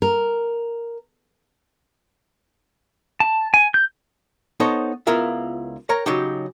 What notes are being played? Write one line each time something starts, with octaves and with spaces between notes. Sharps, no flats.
A#4
A5
G#5
G6
B3 D#4 A4 C5 C#5 D#5
C#2 B3 E4 F4 A#4 E5
A#4 C#5 G5 A#5
C#3 F#3 D#4 G4